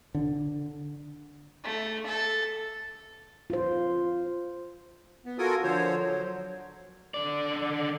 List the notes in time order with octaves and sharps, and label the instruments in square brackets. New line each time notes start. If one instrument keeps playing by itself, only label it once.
[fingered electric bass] D3
[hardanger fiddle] A3
A4
[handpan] F4 C5
[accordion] B3
F4 F#4 A4 A#4 G#5 D#6
D3 F3 C5 C#5
F#3
[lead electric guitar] D3 D5